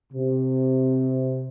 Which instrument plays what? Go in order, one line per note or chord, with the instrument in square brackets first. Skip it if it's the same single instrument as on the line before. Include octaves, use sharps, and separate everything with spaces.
[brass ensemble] C3